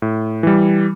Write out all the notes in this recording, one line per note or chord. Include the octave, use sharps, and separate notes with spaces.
A2
E3 G3